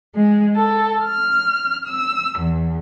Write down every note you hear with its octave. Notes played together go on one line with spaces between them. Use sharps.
G#3
A4
F6
E6
E2